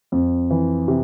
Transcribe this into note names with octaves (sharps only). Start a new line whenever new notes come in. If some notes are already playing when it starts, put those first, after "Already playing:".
F2
E3
C3